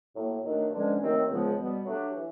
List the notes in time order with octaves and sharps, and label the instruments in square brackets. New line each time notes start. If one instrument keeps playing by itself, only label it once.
[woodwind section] A2 F#3 A#3
D#3 F#3 A3 D4
G2 D3 F3 G#3 C#4
D#2 D#3 F#3 A3 C4
C#2 C#3 F3 G#3 B3
B2 G3 B3
F#3 A3 D4 G4
E3